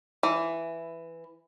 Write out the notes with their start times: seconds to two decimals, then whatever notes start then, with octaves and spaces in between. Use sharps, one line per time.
0.23 E3